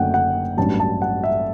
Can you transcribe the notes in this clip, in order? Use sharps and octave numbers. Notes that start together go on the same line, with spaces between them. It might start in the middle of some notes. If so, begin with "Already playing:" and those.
Already playing: F#1 F#2 D3 A3 F#5 G5
F#5
A1 G2 F#3 A5
A5
F#5
E5